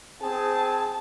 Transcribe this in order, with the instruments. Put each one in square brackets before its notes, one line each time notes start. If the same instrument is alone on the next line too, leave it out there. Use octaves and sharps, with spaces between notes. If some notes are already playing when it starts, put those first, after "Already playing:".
[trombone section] C4 G#4 [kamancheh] A5